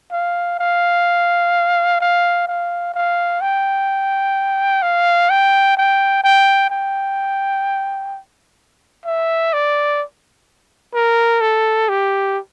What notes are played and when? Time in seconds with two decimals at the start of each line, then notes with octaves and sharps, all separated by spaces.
0.11 F5
0.59 F5
2.00 F5
2.48 F5
2.94 F5
3.41 G5
4.82 F5
5.30 G5
5.77 G5
6.24 G5
6.70 G5
9.06 E5
9.53 D5
10.94 A#4
11.41 A4
11.89 G4